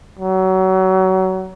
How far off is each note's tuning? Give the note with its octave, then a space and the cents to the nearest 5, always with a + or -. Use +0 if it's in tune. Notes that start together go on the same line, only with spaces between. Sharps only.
F#3 +25